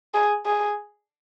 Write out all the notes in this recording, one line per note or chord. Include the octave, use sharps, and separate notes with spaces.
G#4
G#4